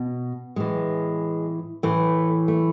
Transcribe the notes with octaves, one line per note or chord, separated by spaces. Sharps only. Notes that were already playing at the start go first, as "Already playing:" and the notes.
Already playing: B2
A2 E3 G#3
A2 E3 A3
A3